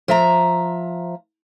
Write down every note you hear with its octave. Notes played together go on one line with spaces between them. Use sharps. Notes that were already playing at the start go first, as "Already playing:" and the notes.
F3 E5 A#5